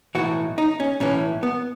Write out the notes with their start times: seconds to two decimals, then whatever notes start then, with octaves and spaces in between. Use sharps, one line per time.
0.15 B1 A2 E3 F#4
0.58 D#4
0.80 C#4
1.00 B1 A2 E3 C#4
1.43 B3